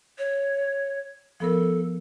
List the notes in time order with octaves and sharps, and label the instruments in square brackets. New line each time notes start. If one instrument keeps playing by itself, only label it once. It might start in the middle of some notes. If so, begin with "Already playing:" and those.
[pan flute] C#5
[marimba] F3 B3 A#4 [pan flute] A4